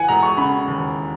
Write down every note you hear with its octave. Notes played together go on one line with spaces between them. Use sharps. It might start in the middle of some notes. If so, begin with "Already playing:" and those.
Already playing: E3 F#5 G#5
E1 A#5
C#6
C#3 B5
D#2